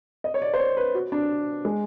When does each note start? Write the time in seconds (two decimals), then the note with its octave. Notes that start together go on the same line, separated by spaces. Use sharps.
0.24 D#5
0.34 C#5
0.42 D5
0.54 C5
0.59 C#5
0.77 B4
0.95 F#4
1.12 D4
1.65 G#3